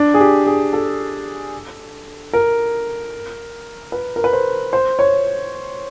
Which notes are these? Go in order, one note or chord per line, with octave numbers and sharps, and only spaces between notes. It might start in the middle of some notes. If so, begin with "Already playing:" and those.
Already playing: D4
G#4
G4
G#4
A4
A#4
B4
A#4
B4
C5
C5
C#5